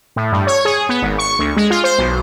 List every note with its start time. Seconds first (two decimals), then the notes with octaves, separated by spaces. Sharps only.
0.16 A2
0.32 G2
0.47 C#5
0.65 G#4
0.89 B3
1.02 G#1
1.18 C#6
1.39 D2
1.57 G#3
1.70 F4
1.84 C5
1.98 B1